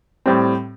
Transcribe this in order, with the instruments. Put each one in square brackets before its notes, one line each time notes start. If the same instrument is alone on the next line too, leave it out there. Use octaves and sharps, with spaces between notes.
[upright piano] A2 G3 C4